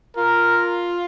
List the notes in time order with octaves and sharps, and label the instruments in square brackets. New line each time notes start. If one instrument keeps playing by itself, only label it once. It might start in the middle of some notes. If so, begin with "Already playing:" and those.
[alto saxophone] F4 [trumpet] A#4